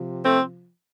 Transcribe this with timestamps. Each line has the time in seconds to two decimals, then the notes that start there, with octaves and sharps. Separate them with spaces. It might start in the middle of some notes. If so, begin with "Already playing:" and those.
Already playing: C3 F3
0.25 A3 C4